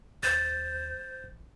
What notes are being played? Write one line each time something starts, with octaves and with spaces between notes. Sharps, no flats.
D#2 C5 A6
A1